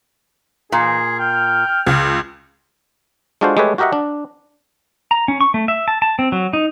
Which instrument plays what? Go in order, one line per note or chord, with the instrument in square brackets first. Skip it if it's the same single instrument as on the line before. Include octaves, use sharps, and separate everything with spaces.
[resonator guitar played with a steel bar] A#2 [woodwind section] E3 D#4 [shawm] G#4
[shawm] G5 [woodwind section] F6
[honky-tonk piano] C#2
[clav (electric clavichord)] G#3 D4 F4 F#4 A4 C5
G#3 A3 G4 A4 B4 C#5
F#4 G4 A#4 D#5 E5 F#5
D4
[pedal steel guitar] A#5
C#4
C#6
A3
E5
A5
A5
C4
F#3
D#4